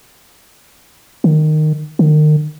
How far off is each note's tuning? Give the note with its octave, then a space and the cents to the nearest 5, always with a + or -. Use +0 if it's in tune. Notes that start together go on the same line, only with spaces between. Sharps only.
D#3 -15
D#3 -35